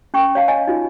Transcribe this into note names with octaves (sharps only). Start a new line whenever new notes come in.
C#4 G5 C#6
C#5 F5 A5
C#5 D#5 G#5
D#4 F4